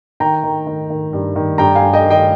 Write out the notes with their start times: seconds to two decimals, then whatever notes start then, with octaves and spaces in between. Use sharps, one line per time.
0.20 D#3 G5 A#5
0.44 D#3
0.67 D#3
0.90 D#3
1.13 G2
1.36 D#3
1.58 G2 G5 A#5
1.75 F5 G#5
1.82 G2
1.93 D#5 G5
2.05 D#3
2.10 D#5 G5